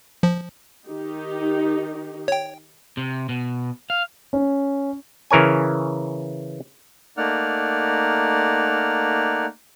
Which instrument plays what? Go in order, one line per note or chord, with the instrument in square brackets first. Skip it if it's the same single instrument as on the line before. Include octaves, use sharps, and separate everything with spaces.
[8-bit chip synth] F3
[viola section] D#3 D#4 G4
[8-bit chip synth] C#5 G5
[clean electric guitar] C3
B2
F5
[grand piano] C#4
[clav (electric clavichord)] C#3 E3 A#4 C#5 G#5
[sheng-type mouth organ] A3 A#3 D#4 D5 F#5 F6